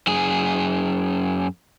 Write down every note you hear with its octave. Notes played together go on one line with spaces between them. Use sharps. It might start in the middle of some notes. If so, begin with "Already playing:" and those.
F#2 G#4